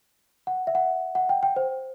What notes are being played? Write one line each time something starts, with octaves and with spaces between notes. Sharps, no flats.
F#5
E5
F#5
F#5
G5
G5
C5